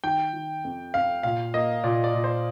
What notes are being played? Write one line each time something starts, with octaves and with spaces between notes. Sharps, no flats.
D#3 G5
D#3
F2
F2 F5
A#2 F5
A#3 D#5
A#2 D5
D5
A#2
C5